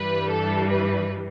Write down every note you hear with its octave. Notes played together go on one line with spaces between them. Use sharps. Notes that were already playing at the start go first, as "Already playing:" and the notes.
Already playing: G2 E3 G3 B4
A4
B4